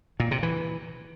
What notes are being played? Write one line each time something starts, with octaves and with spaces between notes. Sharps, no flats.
A#2
C3
E3